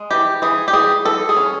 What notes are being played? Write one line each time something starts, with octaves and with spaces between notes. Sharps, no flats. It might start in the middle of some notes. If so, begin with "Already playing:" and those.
Already playing: G#3
E3 G4
E3 G#4
G4
E3 G#4
E3 A4
G#4
C#4